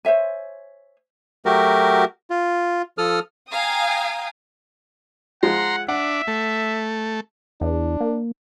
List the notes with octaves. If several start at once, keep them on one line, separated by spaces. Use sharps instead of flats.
C5 C#5 E5 G#5
F#3 A3 F#4 G4 A#4
F4
F3 A4 D#6 F6
F5 G5 G#5 A#5 D#6
F3 G#3 F4 F#5 A#5 C6
D4 E5 F#5
A3
E2 D4
A#3